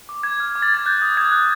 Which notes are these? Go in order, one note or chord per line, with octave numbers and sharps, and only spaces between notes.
D6
D6 G#6
F6
D6
A6
D6 G#6
F#6 G6
D#6
D#6 G#6
F#6